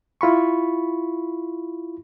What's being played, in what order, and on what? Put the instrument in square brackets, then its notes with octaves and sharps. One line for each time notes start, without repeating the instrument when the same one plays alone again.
[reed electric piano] E4 F4 B5 C#6